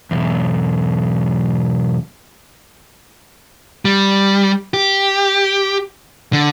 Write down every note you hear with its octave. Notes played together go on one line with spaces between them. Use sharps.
B1 E2
G3
G4
D3